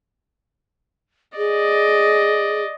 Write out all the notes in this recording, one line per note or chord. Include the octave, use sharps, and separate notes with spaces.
G#4 D5 D#5